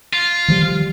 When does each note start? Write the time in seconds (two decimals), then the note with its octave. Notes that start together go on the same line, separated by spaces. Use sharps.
0.13 F4
0.48 D#3 F3 G3